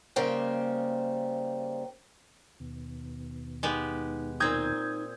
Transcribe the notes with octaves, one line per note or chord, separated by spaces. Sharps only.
C#3 G3 A#3 C5 G5
D#2 B2
G#3 B3 D#4 G4
A#2 C4 D#4 A#5 D#6 G6 G#6